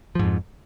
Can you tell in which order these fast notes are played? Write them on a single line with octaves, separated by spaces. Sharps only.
F3 G#2 F2